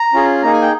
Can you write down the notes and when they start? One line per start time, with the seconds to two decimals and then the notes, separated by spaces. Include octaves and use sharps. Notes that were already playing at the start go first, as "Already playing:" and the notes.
Already playing: A#5
0.13 C#4 F4 G#4
0.42 A#3 D#4 G#4 A#5
0.53 G#5
0.62 G5